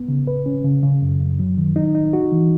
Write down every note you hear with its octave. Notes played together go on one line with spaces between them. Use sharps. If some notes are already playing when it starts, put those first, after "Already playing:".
Already playing: B3
C#3
B4
C#4
C#3
C#3
F#2
F#2
F#3
D#3
D#4
D#4
F#4
E3